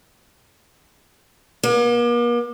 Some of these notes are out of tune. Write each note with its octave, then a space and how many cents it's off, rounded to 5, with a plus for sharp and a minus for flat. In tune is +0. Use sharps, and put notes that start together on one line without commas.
A#3 +45